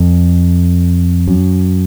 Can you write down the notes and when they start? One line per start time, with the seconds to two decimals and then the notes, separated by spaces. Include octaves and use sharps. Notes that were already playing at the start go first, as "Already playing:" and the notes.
Already playing: F2
1.28 F#2